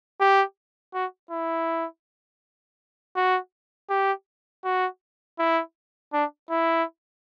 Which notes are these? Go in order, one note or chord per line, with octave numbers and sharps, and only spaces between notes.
G4
F#4
E4
F#4
G4
F#4
E4
D4
E4